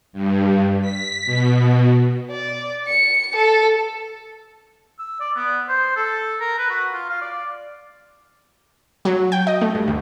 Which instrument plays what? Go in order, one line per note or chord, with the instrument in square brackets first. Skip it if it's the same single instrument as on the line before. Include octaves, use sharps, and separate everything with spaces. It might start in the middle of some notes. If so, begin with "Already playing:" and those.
[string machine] G2
B6
B2
[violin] D5
C#7
A4
[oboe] E6
D5
B3
C5
A4
A#4
B4
F#4
F4
F5
D5
[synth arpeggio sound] F#3
G5
D#5
A3
G2
D2